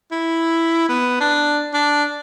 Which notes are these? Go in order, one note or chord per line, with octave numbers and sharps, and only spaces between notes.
E4
B3
D4
D4